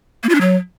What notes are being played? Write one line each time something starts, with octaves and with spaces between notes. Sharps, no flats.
A#3
F4
D4
F#3